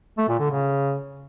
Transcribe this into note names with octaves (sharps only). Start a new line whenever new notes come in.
A3
A#2
D3
C#3